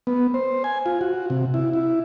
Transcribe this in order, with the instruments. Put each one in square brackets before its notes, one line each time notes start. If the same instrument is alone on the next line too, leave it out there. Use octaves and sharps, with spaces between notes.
[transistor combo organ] B3
C5
G#5
F4
F#4
C3
E4
E4